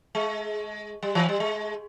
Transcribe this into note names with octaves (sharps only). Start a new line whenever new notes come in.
G#3
G3
E3
G3
G#3